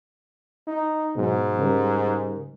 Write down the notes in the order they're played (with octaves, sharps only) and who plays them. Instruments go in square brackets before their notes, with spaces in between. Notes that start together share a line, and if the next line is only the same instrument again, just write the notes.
[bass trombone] D#4
[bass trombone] G#2 [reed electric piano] B2 F#3
[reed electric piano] C#3 G3 A#4